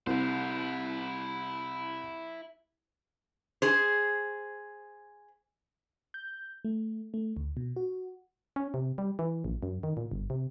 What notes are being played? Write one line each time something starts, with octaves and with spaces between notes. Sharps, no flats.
C2 E4 C5
G#4 C5
G6
A3
A3
D2
B2
F#4
C#4
C3
G3
E3
A#1
F#2
D#3
A#2
G1
C3